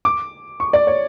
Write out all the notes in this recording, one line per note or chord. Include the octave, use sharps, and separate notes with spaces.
D6
C#6
D5
C#5